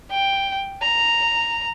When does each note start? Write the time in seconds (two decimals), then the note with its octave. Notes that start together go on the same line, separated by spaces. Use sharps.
0.11 G5
0.82 A#5